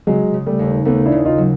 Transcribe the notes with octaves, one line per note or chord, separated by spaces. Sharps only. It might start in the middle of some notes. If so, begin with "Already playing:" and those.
C#3 F#3 G#3
C#3
G3 A3
D#2
D#2 A3 B3
D4 E4
C#3
D#4 F4
F#3